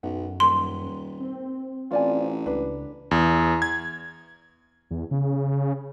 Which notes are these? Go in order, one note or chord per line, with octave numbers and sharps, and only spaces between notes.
B1 F#2 F#5
D#1 C6
C4
A1 F4 D5 G#5
C#2 D4 B4
E2
G#6
E2
C#3